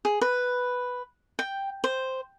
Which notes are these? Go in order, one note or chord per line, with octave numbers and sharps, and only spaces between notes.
G#4
B4
G5
C5